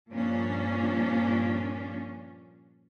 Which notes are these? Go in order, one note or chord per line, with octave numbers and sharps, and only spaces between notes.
G2 A#2 F3 C#4 D4